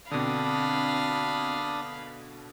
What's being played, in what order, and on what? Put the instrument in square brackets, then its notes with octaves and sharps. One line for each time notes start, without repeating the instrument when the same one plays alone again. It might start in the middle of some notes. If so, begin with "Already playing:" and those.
[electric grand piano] B2 D3 [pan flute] C4 [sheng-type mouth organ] D4 D#6 [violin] F5 B5